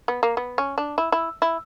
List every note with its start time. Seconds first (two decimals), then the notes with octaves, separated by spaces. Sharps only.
0.08 B3
0.23 A#3
0.37 B3
0.58 C#4
0.78 D4
0.98 E4
1.12 E4
1.42 E4